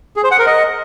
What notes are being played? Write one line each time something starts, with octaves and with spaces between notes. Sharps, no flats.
G#4
C5
F#5
A#4
D#5